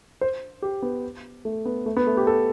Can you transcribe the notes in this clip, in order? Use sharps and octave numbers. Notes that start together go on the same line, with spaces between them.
C5
G4
B3
A3
B3
A3
B3
A3
G4
A4